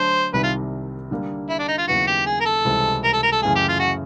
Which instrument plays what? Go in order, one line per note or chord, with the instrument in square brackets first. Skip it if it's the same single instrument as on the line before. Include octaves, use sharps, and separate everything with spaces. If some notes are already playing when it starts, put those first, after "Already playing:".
Already playing: [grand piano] D3 F#3 A3 D4 [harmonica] C5
[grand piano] C2 C3 D#3 G3 [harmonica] B4
[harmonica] F4
[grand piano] D3 G3 A#3
[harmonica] E4
D4
D#4
F4
[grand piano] D#2 C#3 F#3 B3 E4 [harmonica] F#4
[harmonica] G4
G#4
A#4
A4
[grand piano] C#2 C3 E3 G3 C4
[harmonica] A#4
A4
A#4
A4
[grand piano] F#2 C#3 E3 A3 [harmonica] G#4
[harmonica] G4
F4
F#4